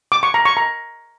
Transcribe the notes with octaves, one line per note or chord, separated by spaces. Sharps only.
D6
C#6
A#5
C#6
A#5